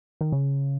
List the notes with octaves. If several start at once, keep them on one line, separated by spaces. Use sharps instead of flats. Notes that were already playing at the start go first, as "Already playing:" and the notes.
D#3
C#3